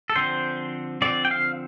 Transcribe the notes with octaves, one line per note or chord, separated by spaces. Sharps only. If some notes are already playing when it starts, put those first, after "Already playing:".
A4
D3 F3 C4 C5
D3 F3 C4 D5
G5
F5